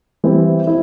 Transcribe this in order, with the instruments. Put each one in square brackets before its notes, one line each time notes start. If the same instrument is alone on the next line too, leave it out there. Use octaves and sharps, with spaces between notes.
[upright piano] E3 G3 C4 E4
E4